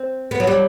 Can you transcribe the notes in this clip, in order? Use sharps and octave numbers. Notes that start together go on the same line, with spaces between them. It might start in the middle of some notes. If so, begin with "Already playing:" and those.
Already playing: C4
B3
F#3
G3